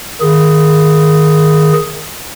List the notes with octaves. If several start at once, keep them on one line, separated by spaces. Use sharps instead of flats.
D#3 G#4